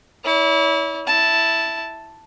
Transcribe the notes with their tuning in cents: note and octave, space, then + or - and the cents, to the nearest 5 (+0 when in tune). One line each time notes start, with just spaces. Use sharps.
E4 -25 C#5 +45
E4 +0 A5 +0